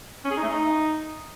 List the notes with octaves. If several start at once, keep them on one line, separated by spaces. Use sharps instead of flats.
C#4
G#4
D#4
A3
D#4